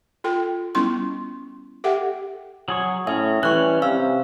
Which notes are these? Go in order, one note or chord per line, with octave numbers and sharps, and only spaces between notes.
F4 A4 G5
G3 B3 C#4 E4 C6 C#6
G4 A4 E5 F#5 G5
F#3 G#4 C#5
A2 C#4 G#4 E5
E3 G3 C#4 C#6 F#6
C3 F5 E6